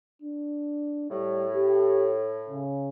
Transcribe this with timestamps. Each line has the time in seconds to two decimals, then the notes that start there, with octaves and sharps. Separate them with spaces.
0.22 D4
1.10 A2 G3
1.54 G4
2.49 C#3